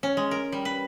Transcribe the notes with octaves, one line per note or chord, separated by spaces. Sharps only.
C#4
G#3
A#4
G3
B4